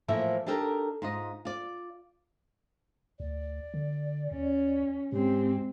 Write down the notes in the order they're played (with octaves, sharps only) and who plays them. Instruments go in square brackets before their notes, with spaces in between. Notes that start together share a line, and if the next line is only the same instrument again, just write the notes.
[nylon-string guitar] A2 E3 F3 A#3 E5
D4 D#4 G4 A4 A#4
G#2 F4 D#5
F4 D5
[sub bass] D2 [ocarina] D5
[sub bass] D3
[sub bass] D#2 [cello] C#4
[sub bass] G#2 [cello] G#3 C4 [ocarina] G4